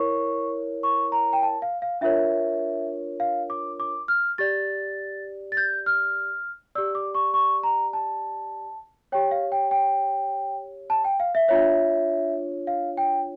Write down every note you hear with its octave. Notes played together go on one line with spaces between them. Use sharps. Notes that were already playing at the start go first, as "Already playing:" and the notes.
Already playing: E4 A#4 C#5 C#6
C#6
A#5
G5
A5
F5
F5
D4 F4 A#4 C#5 E5
F5
D6
D6
F6
G4 D5 A6
A6
G6
F6
G4 D5 E6
D6
C#6
C#6
A#5
A5
G4 C#5 G5
F5
G5
G5
A5
G5
F5
E5
D4 F4 C#5 E5
F5
G5